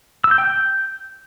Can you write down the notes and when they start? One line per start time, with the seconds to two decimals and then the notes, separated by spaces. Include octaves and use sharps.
0.24 E6
0.31 G6
0.38 G5
0.45 G6